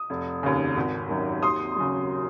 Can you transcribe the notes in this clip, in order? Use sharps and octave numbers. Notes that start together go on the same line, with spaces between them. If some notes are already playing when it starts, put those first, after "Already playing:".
Already playing: D#6
F1
D#2 C#3
G#1
F#2 D#3
D#2 C6 D#6
C#3 F#3